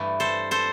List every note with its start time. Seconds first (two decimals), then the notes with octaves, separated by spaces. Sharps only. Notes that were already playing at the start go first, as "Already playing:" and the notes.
Already playing: G2 E3 A3
0.20 A4 C5
0.51 A4 C5